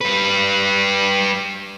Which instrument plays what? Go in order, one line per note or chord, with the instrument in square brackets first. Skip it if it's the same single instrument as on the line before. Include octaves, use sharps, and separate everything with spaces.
[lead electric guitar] G3 B4